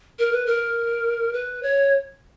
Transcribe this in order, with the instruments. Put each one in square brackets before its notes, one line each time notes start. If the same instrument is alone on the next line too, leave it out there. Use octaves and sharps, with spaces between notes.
[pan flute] A#4
B4
A#4
B4
C#5